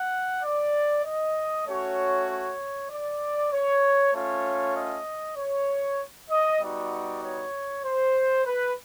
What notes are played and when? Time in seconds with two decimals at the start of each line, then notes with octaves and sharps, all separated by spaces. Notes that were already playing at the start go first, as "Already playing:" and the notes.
Already playing: F#5
0.43 D5
1.05 D#5
1.66 A3 C#4 F#4 C#5
2.28 C#5
2.90 D5
3.52 C#5
4.14 A3 C#4 F4 C#5
4.75 D#5
5.37 C#5
6.30 D#5
6.60 G3 B3 D#4 F#4 D5
7.22 C#5
7.84 C5
8.45 B4